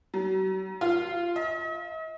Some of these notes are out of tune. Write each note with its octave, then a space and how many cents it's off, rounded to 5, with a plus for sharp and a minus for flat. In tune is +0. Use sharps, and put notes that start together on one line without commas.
F#3 +40
F4 -10
D#5 +45